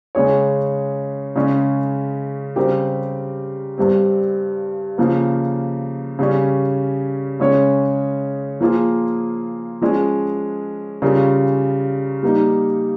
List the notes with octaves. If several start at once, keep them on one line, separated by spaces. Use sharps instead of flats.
C#3 G#3 C#4 G#4 C#5
C#3 G#3 C#4
C#3 G3 C4 G4 A#4
G2 G3 C4
C#3 F3 A#3
C#3 G3 C#4
C#3 G#3 C#4 G#4 C#5
F3 A#3 F4 G#4
F3 G#3 C#4 G#4
C#3 G3 C#4 F4 A#4
G3 A#3 D#4